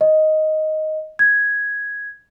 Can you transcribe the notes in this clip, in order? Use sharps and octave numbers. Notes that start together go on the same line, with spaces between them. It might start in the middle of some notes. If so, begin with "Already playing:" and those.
D#5
G#6